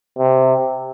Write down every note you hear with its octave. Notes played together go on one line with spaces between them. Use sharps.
C3